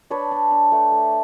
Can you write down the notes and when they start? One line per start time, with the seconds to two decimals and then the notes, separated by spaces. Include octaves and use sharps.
0.10 D4 B4 C#5
0.31 D4
0.51 D4
0.72 A3
0.92 A3